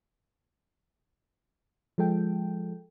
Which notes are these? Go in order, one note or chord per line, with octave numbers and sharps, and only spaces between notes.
F3 G#3 A4 G5